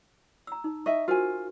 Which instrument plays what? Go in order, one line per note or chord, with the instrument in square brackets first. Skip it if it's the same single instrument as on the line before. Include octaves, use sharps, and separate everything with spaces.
[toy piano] A#5 E6
D#4
[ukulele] D#5 E5 [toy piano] C#6
[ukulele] F4 G#5 [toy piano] F#4 A#4 C5